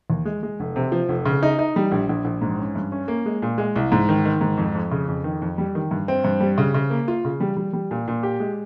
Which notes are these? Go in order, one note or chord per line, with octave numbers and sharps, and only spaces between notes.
D#2
G#3
G#3
F1
C3
F3
F1
C#3
D#4
D#4
G3
A#1
A#1
A#1
G#2
C#4
G2
C#4
A#3
G#3
A#2
G#3
C2
G#2
D#3
D#3
G#2
F2
F2
C#3
F2
D#3
F2
G3
D#3
G2
C4
G2
G3
C#3
C#3
A#3
F4
C#3
G3
G3
G3
A#2
A#2
G4
G#3